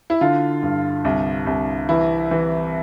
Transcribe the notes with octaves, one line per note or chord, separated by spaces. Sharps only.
E4
D3 F4
G2
C2
C2
E3 E4
E3